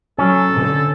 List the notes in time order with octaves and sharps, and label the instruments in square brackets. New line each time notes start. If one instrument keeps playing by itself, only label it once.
[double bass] F#3 [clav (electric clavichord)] C#4 [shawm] A4
[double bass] D3